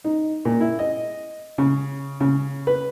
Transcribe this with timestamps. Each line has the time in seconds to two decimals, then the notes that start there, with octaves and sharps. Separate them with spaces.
0.04 D#4
0.45 A#2
0.60 E4
0.79 D#5
1.58 C#3
2.20 C#3
2.67 B4